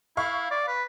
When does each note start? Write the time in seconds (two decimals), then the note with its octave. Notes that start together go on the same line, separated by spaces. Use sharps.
0.17 E4 F5 C#6
0.51 D5
0.68 B4